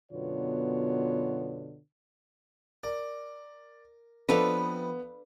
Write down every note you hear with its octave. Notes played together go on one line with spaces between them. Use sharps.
F#2 B2 D3 B3 F4 C#5
A#4 D5
F3 B3 C4 D4 D#4 A4 B4 F5